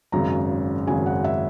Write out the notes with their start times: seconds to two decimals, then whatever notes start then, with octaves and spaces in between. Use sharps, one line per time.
0.12 G#1 F#2 C#3 A#5
0.87 G#1 F#2 C#3 G#5
1.06 F#5
1.24 E5